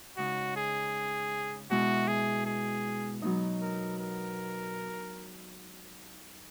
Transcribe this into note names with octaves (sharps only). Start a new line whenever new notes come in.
C#3 G#3 D#4 F#4
G#4
B2 G#3 B3 E4 F#4
G#4
G#4
F#3 B3 D#4
A#4
A#4